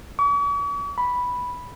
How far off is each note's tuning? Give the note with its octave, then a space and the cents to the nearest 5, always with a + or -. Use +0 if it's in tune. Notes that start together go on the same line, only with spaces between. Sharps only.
C#6 +45
B5 -5